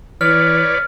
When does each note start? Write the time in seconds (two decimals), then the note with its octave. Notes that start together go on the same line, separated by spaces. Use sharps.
0.21 E3 B4 C#5 D5 F6